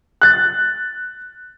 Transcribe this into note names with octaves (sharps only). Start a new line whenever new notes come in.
F#6 A6